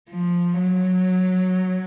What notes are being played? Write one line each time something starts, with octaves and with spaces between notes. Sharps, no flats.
F3
F#3